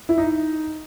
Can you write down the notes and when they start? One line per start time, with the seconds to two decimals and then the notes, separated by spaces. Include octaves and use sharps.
0.09 E4
0.18 D#4